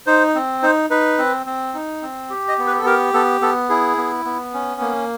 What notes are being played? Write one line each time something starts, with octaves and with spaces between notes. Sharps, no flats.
D#4 C5
C4
D#4 C5
D#4 B4
C4
C4
D#4
C4
G4
D#5
B3
B4
A4
G4 A#4
B3 A4
B3 A4
E4 G#4
B3
B3
C#4
A#3